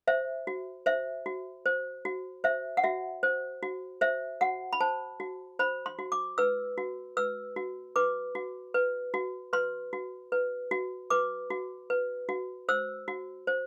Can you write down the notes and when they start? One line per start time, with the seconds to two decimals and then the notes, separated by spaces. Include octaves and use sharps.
0.08 C5 E5
0.47 F#4
0.86 C5 E5
1.26 F#4
1.66 C5
2.05 F#4
2.44 C5 E5
2.77 F#5
2.84 F#4 E5
3.23 C5
3.63 F#4
4.01 C5 E5
4.41 F#4 F#5
4.73 B5
4.81 C5 A5
5.20 F#4
5.59 C5 B5
5.86 C6
5.99 F#4
6.12 D6
6.38 B4 E6
6.78 F#4
7.17 B4 E6
7.56 F#4
7.96 B4 D6
8.35 F#4
8.74 B4
9.14 F#4
9.53 B4 C6
9.93 F#4
10.32 B4
10.71 F#4
11.10 B4 D6
11.50 F#4
11.90 B4
12.29 F#4
12.69 C5 E6
13.08 F#4
13.47 C5